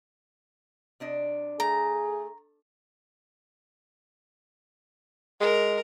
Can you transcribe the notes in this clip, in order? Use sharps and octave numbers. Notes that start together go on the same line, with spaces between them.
C3 D4 D#5
A3 G#4 A#5
G#3 A#4